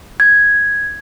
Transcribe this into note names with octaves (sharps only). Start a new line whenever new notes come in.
G#6